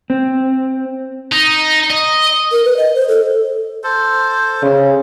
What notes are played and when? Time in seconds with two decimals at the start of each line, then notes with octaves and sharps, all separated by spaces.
0.10 C4
1.32 D#4
1.90 D#5
2.52 A#4
2.65 B4
2.77 D#5
2.95 C5
3.09 A4
3.84 A4 C5
4.62 C#3